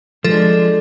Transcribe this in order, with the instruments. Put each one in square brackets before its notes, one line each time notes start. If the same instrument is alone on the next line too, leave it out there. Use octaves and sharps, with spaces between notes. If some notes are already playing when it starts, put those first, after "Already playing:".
[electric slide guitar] F3 [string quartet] G#3 D4 [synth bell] A4